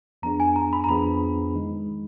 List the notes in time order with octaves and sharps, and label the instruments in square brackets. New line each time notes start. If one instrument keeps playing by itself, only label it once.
[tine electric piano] F2 F3 B3 D4 G#4 [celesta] A#5
[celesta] G#5
A#5
B5
A#5
[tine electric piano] F2 F3 B3 D4 G#4 [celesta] B5
[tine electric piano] D#3 G#3 D#4